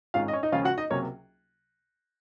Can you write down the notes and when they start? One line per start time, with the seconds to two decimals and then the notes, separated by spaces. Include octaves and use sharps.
0.14 G#1 G#2 D#3 G#3 C#4 F4 F5
0.28 D#5
0.33 C#4 C#5
0.43 D#4 D#5
0.52 D#2 C#3 F3 G#3 C#4 F4 F5
0.65 F#4 F#5
0.78 D#4 D#5
0.90 C#2 C3 F#3 A#3 C#4 C#5